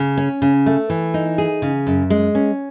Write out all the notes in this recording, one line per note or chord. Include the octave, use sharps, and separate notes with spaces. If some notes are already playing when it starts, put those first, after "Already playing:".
Already playing: C#3
C#4
C#3
A3
E3
D#4
G#4
C#3
F#2
G#3
C#4